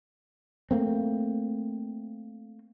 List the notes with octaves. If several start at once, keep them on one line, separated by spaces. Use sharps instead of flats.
A3 A#3 C4